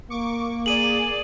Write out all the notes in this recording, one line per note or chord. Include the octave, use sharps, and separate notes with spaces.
A#3 C#6 D6
G#4 D5 D#7 F#7